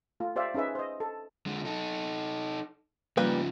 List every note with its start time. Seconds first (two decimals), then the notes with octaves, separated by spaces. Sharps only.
0.20 A3 F4
0.36 G4 C5 D5 E5 F5
0.54 C#4 D#4 G#4 B4 E5
0.75 C5 D#5
1.00 A4
1.46 D3 G#3
1.65 D#4 A4
3.17 C#3 F3 G3 A#3 B4